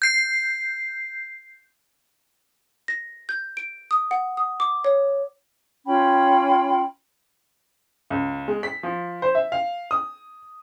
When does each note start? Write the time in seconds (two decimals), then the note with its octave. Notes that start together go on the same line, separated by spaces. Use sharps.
0.02 G6 C7
2.88 A#6
3.29 G6
3.57 D7
3.91 D#6
4.11 F#5
4.37 D#6
4.60 D6
4.84 C#5
5.86 C#4 F4 G5 B5
8.10 C#2
8.48 G#3
8.63 B6
8.83 F3
9.22 C5
9.35 E5
9.52 F5
9.91 D#6